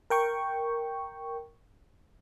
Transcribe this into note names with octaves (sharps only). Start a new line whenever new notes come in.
A#4 G5 C#6